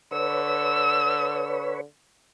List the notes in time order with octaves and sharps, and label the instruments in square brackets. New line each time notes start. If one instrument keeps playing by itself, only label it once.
[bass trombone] D3 [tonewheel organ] B4 C#5 [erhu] E6